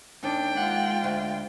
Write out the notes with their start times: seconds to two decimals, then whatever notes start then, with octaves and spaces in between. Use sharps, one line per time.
0.23 D#2 C#4 D4 G5
0.57 G#3 F4 F#5
1.04 D2